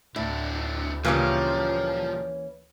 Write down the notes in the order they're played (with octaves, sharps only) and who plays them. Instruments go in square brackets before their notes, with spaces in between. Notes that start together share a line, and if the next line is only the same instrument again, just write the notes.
[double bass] D2 [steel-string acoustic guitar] A2 [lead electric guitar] D4 E4
[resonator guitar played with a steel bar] A#2 C#3 G3 [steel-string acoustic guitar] E3 A#3 C#4 [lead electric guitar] F3